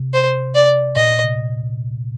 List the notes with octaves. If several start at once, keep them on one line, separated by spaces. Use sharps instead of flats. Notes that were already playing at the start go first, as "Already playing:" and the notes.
Already playing: C3
C5
D5
A#2 D#5
C3